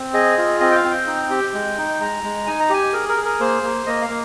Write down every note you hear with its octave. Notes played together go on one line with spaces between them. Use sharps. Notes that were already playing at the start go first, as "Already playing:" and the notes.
Already playing: C4
G#4 D#5
F4
C4 D#5
G5
F5
C4
G5
D#4
G4
G#3
D#4
G#3 A#5
G#3
D#4 G#5
A#5
G4 G#5
G#4 A#4
A#4
G#4
A#4
A#3 C5
A#3
A#3 D#5
F5
A#3